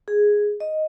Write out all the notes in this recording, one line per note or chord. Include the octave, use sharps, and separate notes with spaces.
G#4
D#5